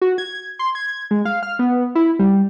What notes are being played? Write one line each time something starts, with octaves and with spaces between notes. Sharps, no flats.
F#4
G#6
C6
G#6
G#3
F5
F6
B3
E4
G3